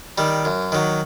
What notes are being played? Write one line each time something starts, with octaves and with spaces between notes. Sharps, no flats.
D#3 G3
F#2
D#3 F#3